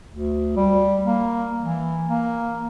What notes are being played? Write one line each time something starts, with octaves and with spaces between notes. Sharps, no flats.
D2
G3
A#3
E3
A#3